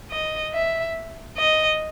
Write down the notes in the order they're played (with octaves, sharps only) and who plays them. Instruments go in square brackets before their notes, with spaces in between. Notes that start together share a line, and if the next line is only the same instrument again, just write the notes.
[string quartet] D#5
E5
D#5